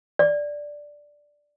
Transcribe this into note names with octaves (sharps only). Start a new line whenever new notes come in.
D5